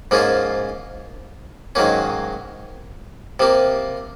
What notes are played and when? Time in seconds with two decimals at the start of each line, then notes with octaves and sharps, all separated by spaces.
0.11 G#2 F3 A#3 C#4 F4
1.75 G#2 D#3 F#3 A#3 C#4
3.39 C3 F3 A#3